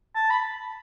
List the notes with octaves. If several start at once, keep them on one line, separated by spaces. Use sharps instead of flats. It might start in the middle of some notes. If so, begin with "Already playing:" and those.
A5
B5